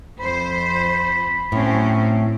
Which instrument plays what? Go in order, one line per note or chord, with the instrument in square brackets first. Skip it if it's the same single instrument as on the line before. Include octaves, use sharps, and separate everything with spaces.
[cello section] F2 C5 [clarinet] B5
[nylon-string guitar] A2 [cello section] F#3 C4 C#4